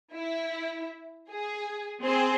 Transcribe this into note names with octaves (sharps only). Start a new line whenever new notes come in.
E4
G#4
C4 G#4 C5